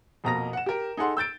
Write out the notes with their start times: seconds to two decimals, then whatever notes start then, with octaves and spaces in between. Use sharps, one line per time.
0.24 F2 B2 A#3 A#5 D#6 A#6
0.53 F#5 E7
0.66 G4 A#4
0.97 D#4 G#4 A4 F#5 C6
1.17 E6 G6 A6 D7